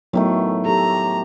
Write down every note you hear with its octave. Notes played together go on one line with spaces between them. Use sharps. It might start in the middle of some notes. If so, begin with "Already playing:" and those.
A2 D#3 F#3 A3 B3
G4 A4 A#5